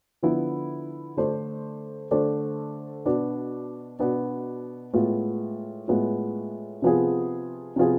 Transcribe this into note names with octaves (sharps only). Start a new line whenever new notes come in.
D3 F3 B3 E4
D3 A3 D4 A4 C5
D3 A3 D4 A4 C5
B2 B3 D4
B2 B3 D4
A2 G#3 B3 F4
A2 G#3 B3 F4
C3 F3 B3 F4 G#4
C3 F3 B3 F4 G#4